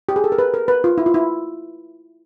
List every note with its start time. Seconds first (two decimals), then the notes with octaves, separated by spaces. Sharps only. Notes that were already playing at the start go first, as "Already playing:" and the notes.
0.09 G4
0.16 G#4
0.24 A4
0.32 A#4
0.39 B4
0.54 A#4
0.68 B4
0.84 F4
0.98 E4
1.06 F4
1.14 E4